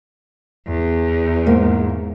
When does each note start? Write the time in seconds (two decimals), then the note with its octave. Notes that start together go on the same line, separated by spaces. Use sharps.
0.67 E2
1.47 G#2 A#3